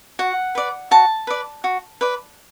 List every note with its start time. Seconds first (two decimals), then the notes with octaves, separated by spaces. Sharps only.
0.19 F#4 F#5
0.55 B4 D5
0.91 F#4 A5
1.27 B4 D5
1.64 F#4
2.01 B4 D5